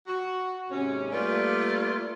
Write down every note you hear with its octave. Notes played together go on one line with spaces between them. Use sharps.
F#4
D#2 G#2 C3 C#4
G3 A3 A#3 F4 B4 D5